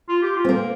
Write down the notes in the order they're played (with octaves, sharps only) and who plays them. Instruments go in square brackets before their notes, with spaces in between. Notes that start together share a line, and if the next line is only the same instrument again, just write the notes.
[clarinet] F4
G4
F4
[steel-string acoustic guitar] C4
A#3